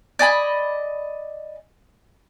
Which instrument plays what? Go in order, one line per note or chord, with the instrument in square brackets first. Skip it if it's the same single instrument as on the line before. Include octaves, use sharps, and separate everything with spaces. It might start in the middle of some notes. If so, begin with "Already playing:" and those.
[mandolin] D5 D#5 G#5 B5